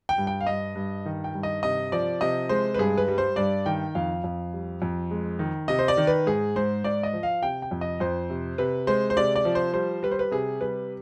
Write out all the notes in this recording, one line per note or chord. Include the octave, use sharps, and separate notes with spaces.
G5
G2
G5
F5
G2 D#5
G2
D#3
G5
G2
D#5
C3 D#5
F3 D5
C3 D#5
G#3 C5
B4
G2 G#4
B4
G3
C5
G2 D5
D#3 G5
F2 F5
F2
G3
F2
G#3
D#3
C3 D#5
C5
D5
D#3
B4
G#2 G#4
G#2 C5
G#2 D5
D#5
F3
F5
C3 G5
G5
F2
D#5
F2 C5
C3
C3 B4
G#3 C5
C5
C3 D5
D5
F3
C5
G3 C5
G3 B4
C5
B4
C3 G#4
G3 B4